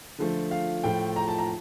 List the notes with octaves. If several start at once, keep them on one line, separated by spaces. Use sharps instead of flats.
D3 F3 A3
F5
A2 F3 A3 G5
A#5
A5
A#5